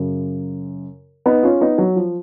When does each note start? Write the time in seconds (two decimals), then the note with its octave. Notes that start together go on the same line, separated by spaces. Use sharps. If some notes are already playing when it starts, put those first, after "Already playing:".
Already playing: F#2 C#3
1.26 B3 D#4
1.43 C#4 F4
1.61 B3 D#4
1.78 F#3
1.96 F3